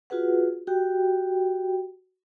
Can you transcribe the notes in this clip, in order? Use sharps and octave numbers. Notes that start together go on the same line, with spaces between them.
F4 F#4 G#4 B4 F#5
F#4 G4 G5